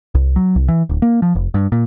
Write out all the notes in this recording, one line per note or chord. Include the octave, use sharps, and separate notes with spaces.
C2
F#3
C2
E3
D1
A#3
F3
F1
G2
A#2